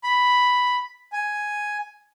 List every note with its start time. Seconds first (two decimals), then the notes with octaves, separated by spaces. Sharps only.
0.04 B5
1.13 G#5